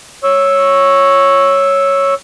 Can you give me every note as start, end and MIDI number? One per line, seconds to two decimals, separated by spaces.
0.24 2.14 73
0.24 2.14 85
0.24 2.14 88